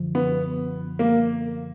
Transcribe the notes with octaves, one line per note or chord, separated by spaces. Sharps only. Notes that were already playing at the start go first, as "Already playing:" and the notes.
Already playing: F#2 D3 F3
B3
A#3